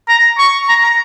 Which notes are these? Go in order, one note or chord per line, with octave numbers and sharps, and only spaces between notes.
A#5
C#6
A#5
A#5